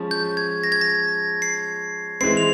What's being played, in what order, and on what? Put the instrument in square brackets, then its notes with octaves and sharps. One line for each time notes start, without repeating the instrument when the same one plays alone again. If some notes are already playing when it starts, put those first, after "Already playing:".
Already playing: [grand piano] F3 G#3 C#4
[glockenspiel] G6
G#6
A#6
G#6
A#6
C7
[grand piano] E3 G#3 C4 [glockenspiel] C7
[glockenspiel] F7